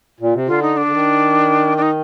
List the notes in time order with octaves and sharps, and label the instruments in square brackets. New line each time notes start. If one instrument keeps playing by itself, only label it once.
[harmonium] A#2
C3
[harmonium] D3 [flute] F4
[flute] D#4
D4
[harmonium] D3
D#3
[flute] D4
D#4